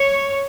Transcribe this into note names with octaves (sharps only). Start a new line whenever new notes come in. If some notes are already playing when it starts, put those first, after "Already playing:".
Already playing: C#5